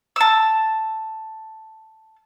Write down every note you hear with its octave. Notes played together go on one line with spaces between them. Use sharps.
A5 E6